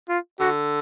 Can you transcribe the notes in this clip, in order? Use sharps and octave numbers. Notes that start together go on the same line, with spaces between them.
F4
D3 F#4